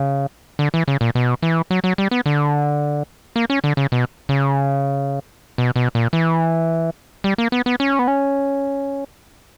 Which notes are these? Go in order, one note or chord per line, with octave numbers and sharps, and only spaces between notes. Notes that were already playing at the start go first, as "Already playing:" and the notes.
Already playing: C#3
D3
E3
C#3
A#2
B2
E3
F#3
F#3
G3
B3
D3
A#3
C#4
D3
C#3
B2
C#3
B2
B2
A#2
E3
G3
A#3
B3
B3
C#4
B3
C#4